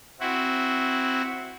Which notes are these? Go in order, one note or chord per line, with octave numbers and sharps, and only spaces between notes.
C4 E4 F#4